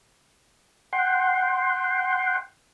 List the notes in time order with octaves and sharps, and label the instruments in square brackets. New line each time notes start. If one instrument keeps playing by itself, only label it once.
[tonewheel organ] F#5 G5 C6